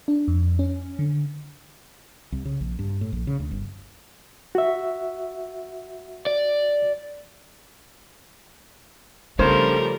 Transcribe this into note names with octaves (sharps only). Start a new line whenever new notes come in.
D4
F2
C#4
D3
C2
C#3
A#1
G2
A2
A#1
C#3
D2
G1
F#4 E5
D5
C#3 F3 G3 A3 B3 D4 A#4 C5